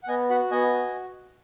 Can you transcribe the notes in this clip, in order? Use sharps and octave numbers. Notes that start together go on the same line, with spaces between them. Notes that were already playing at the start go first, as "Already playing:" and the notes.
F#5
B3 D#5 G#5
F#4 F#5 B5
B3 D#5 G#5
F#4